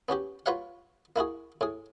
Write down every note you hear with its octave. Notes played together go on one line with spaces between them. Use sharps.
B3 C#4 F#4 G4
F4 F#4 B4 C#5 F5 F#5
A#3 E4 F#4 G#4
A2 G#4